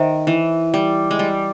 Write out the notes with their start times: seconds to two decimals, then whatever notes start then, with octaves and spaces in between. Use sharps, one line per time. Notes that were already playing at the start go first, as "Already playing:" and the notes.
Already playing: D#3 C5 E5
0.27 E3
0.74 G3
1.11 G#3
1.19 G3